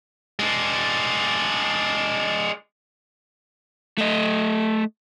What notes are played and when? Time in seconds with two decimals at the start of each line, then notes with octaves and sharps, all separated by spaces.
0.39 G#3 D4
3.98 A3 D#5